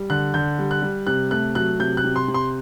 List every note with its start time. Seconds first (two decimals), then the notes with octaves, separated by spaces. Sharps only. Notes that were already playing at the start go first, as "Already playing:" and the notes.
Already playing: G3
0.10 D3 F#6
0.34 D3 G6
0.59 G3
0.71 F#6
0.82 G3
1.07 C3 F#6
1.31 A3 F#6
1.55 F#3 F#6
1.80 C3 G6
1.97 F#6
2.04 C3
2.16 C6
2.28 C3
2.34 C6